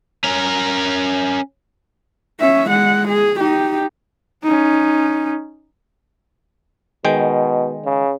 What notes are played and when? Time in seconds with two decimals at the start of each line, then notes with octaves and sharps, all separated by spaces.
0.24 C#4 A#4
2.40 C#4 E5
2.70 G#3 F#5
3.08 G#4
3.39 D#4 G4
4.44 C#4 D#4
7.05 B2 D#3 G#3 G5
7.85 C#3